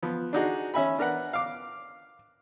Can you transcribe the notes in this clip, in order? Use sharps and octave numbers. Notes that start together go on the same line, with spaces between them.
F3 B3
D4 D#4 F#4 G#4
C#4 E5 G#5 B5
D4 A#4 B4 F#5
F5 D6